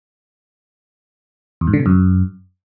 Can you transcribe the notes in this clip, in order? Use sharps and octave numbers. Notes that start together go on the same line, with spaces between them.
E2
G#2
D3
C3
F#2